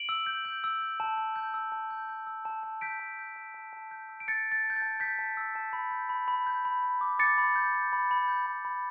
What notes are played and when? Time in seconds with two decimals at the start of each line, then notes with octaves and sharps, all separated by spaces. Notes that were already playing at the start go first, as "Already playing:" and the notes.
Already playing: D7 F#7
0.09 E6
0.26 G6
0.45 G6
0.64 E6
0.82 G6
1.00 A5
1.18 A5
1.36 G6
1.54 E6
1.72 A5
1.91 G6
2.09 G6
2.27 E6
2.45 A5
2.63 A5
2.81 G6 B6 D7
3.00 A5
3.19 G6
3.36 A5
3.54 A5
3.73 A5
3.91 G6
4.09 E6
4.20 D7
4.28 E6 A6 C#7
4.46 G6
4.52 A6
4.64 A5
4.70 G6
4.76 A6
4.82 A5
5.00 G6 B6
5.19 A5
5.37 E6
5.55 A5
5.73 B5
5.91 G6
6.09 B5
6.28 B5
6.47 G6
6.65 B5
6.83 B5
7.01 D6
7.19 D6 A6 C#7
7.38 B5
7.56 G6
7.74 G6
7.93 B5
8.11 B5
8.28 G6
8.46 B5
8.65 B5